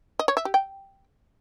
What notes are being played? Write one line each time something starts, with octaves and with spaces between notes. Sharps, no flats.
D#5
C#5
E5
G4
G5